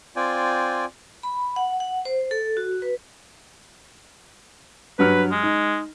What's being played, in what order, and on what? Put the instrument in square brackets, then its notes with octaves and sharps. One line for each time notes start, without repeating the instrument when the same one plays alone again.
[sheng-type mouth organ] C4 F4 D5 G5 G#5
[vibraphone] B5
F#5
F#5
C5
A4
F#4
B4
[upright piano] G2 F#3 F6 [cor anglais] B4
[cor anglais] G#3
[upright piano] D#4